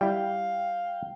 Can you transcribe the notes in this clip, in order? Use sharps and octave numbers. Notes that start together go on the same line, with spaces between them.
G3 E4 F5 G5